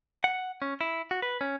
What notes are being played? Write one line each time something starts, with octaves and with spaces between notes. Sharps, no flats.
F#5
C#4
E4
F#4
B4
C#4